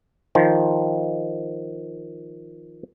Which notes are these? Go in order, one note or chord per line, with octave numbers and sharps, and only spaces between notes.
D#3 F3 C5